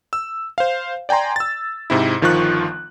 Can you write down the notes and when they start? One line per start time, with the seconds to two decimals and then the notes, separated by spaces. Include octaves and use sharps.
0.13 E6
0.58 C5 F5
1.09 D5 G5 G#5 A#5 C6
1.36 E6 A6
1.90 G#2 C3 E4
2.21 G1 D#3 F3 F4 C#6 F#6